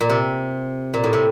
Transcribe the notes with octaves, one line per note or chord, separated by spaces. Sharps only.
A#2
C3
A#2
A2
C3